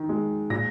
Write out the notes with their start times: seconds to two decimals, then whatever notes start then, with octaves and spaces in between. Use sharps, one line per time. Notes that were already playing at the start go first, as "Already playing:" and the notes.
Already playing: D#3
0.09 G#3
0.50 A#2 A#6